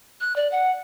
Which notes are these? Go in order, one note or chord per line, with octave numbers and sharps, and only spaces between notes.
F#6
D5
F#5